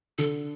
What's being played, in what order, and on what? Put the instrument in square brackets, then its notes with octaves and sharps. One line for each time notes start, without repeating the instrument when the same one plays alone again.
[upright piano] D3 [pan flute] A4